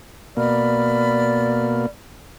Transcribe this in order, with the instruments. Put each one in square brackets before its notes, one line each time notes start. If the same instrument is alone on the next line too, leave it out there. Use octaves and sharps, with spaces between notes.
[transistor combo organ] B2 A#3 [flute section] D5 B5 F6